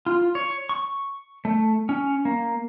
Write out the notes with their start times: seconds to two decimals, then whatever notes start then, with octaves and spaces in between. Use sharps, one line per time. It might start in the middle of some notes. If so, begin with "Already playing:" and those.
0.06 F4
0.35 C#5
0.69 C#6
1.45 A3
1.89 C#4
2.25 A#3